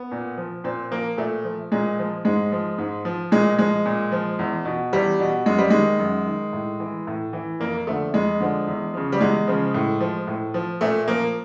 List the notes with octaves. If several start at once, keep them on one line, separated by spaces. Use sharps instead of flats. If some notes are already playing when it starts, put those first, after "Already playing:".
Already playing: B3
A#2
F3
A#2 C4
F3 A#3
A#2 A3
F3
A#2 G#3
F3
G#2 G#3
F3
G#2
F3
A#2 G#3
F3 G#3
A#2
F3
E2
B2
E2 G3
B2
F#2 G#3
G3
D#3 G#3
F#2
D#3
A2
E3
A2
E3
F2 A#3
D3 F3 A3
F2 G#3
D3 F3
E2
C#3 F3
G3
E2 G#3
C#3 F3
A2
F3
A2
F3
A#2 A3
F3 A#3